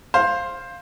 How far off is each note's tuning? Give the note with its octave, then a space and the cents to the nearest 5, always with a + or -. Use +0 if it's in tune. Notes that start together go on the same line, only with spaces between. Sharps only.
C5 +15 F5 +0